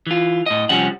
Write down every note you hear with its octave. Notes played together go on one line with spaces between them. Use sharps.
E3 F4
A2 D#5
C2 F3 G3 C#4 F#5